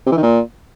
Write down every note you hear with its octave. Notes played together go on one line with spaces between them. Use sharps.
C3
E3
D#3
A#2